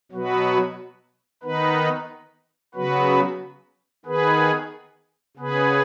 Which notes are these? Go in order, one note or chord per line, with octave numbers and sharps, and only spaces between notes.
B2 F#3 B3 F#4 B4
D#3 B3 D#4 B4
C#3 F#3 B3 F#4 B4
D#3 B3 G#4 B4
C#3 B3 G#4 B4